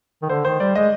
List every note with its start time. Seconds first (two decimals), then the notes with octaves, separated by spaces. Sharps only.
0.22 D#3
0.29 D3 C5
0.45 D#3 C5
0.60 G3 D5
0.75 G#3 D#5